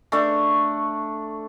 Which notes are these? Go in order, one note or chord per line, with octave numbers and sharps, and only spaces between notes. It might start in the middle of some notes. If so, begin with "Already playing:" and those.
A3 D4